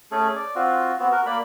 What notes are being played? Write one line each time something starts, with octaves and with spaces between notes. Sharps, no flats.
A3 C#4 G#4 A4
D5
C4 F4 F#4
B3 C4 F#4
F#4 A#4
A#3 D5 B5